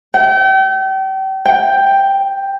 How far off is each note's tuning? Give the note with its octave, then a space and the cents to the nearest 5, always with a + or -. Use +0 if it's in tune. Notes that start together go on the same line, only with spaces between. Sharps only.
G5 -35
G5 +5